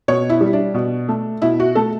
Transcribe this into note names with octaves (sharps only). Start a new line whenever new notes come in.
B2 C#5
E4
G3
D4
B2
A3
B2 E4
F#4
A3 A4